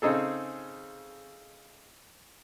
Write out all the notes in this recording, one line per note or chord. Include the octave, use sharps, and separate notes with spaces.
C#3 C4 D#4 G#4 A4